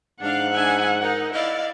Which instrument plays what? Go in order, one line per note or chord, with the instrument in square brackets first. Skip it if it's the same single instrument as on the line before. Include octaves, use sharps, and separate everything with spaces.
[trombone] G#2 [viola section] D4 F5 [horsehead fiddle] F#5
[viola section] D4 E5 G#5
[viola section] D#4 [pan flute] A#4
[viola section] E4 D5 F5 [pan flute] D#5